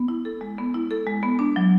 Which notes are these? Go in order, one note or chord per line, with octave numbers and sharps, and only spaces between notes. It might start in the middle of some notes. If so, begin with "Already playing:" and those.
Already playing: B3
E4
A4
G#3
B3
E4
A4
G#3
B3
D4
F#3